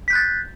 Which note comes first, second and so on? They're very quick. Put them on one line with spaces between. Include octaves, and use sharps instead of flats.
B6 G6 F#6 A6